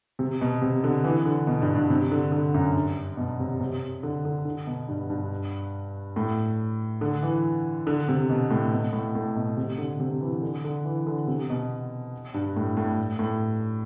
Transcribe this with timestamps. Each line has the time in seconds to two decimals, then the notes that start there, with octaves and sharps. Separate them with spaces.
0.19 C3
0.41 B2
0.62 C3
0.84 D3
1.04 E3
1.25 D3
1.47 B2
1.62 G2
1.75 G2
1.90 C3
2.12 D3
2.32 D3
2.54 F#2
2.76 G2
3.17 B2
3.39 C3
3.60 C3
4.03 D3
4.25 D3
4.45 D3
4.67 B2
4.88 G2
5.10 G2
6.16 A2
7.01 D3
7.22 E3
7.87 D3
8.08 C3
8.30 B2
8.50 A2
8.72 B2
8.93 A2
9.15 A2
9.36 B2
9.57 C3
9.78 D3
10.00 C3
10.21 E3
10.42 D3
10.64 D3
10.85 E3
11.07 D3
11.27 C3
11.50 B2
12.34 G2
12.56 A2
12.77 A2
13.19 A2